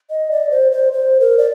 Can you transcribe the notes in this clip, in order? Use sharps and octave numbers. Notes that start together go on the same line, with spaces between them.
D#5
D5
C5
C5
C5
A#4
D5